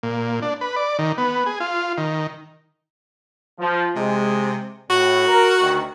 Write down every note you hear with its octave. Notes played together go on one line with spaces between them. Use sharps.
A#2
D4
B4
D5
D#3
B3
G#4
F4
D#3
F3
C3 G#3
A2 F#4
A#4
D2 D#3